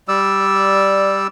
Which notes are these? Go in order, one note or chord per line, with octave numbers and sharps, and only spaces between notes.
G3 D5 E6